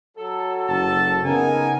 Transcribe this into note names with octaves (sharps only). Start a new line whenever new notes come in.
F#3 A4
F#1 A5
C#3 B3 D#4 A#4 G#5